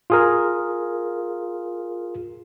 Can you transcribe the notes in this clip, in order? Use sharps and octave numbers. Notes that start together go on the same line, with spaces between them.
F4 G#4 A#4